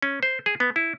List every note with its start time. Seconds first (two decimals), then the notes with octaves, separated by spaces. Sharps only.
0.02 C#4
0.23 C5
0.46 G#4
0.60 B3
0.76 E4